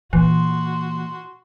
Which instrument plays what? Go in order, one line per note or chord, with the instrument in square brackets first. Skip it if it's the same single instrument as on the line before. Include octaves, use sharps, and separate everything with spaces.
[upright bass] A#2 [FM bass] E3 [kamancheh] F#4 C6